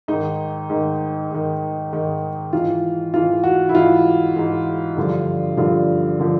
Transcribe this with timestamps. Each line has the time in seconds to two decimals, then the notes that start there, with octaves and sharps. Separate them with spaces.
0.08 G#2 D#3 D#4
0.70 G#2 D#3
1.30 G#2 D#3
1.92 G#2 D#3
2.53 G#2 E3 F4
3.13 G#2 E3 F4
3.44 F#4
3.69 E4
3.75 G#2 E3 F4
4.36 G#2 E3
4.97 G2 D3 F3
5.57 G2 D3 F3 F4
6.20 D3 F3